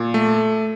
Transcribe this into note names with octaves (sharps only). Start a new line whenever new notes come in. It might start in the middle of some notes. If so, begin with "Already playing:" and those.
Already playing: A#2
A3